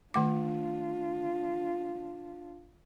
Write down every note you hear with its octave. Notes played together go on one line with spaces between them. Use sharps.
D#3 A3 D4 F4 D6